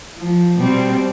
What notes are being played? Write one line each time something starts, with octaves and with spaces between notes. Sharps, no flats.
F3
B2 G3 C4